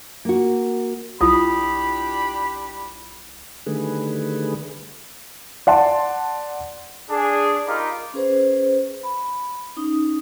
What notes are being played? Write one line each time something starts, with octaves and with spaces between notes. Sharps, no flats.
A#3 F#4
B1 D4 E4 F4 G4 B5 D#6
D3 D#3 G3 A3 G#4 B4
D5 F#5 A5 C6
D4 G#4
D#4 F4 G4 A#4 B5 D6
C#4 G#4 B4 C5
B5
C#4 D#4 D#6